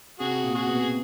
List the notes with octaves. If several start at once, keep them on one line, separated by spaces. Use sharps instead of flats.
C3 F#4 G#4
A#2
F#4 G#4
B2
G#4